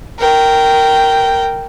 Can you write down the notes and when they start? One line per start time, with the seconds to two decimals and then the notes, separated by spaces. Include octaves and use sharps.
0.19 A#4 G5